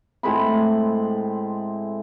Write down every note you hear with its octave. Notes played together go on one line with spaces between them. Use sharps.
A2 G#3 C4 B5